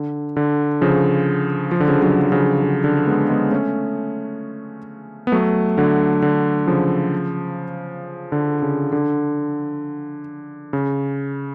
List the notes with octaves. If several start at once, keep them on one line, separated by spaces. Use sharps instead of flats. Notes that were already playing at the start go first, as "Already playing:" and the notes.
Already playing: D3
D3
C#3 F3
F3
D3
C#3 F3
D3 F#3
F#3
C#3 F3
D3
D3
G#3 B3
G#3 B3
A3 C#4
B3
F#3 A3
D3 F#3
D3
C#3 F3
D3
C#3
D3
C#3